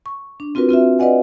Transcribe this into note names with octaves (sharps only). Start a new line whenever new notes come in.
C#6
D4
C4 F4 F#4 A#4 B4
C4 F4 F#4 E5
B4 D5 D#5 F#5 G#5